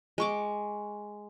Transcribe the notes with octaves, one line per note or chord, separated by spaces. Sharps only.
G#3 C#6 D6